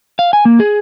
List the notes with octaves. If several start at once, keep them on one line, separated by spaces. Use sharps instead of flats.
F5
G#5
A#3
G#4